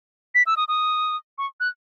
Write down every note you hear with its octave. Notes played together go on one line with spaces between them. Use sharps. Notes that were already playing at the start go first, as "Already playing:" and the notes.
B6
E6
D#6
D#6
C#6
F#6